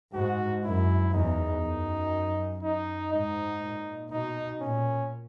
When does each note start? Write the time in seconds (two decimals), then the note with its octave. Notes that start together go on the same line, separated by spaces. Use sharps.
0.14 G#2 F#4
0.64 F#2 E4
1.13 E2 D#4
1.63 F#2
2.63 D#4
3.12 G#2 D#4
3.62 A#2
4.11 B2 D#4
4.61 A#2 C#4